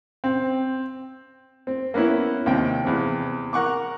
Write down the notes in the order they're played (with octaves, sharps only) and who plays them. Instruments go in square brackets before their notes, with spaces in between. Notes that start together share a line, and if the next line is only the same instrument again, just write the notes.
[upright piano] C4
[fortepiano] C4
A#3 B3 C#4 E4
D#2 C3 G5
E2 C3
A#4 F#5 C#6 D6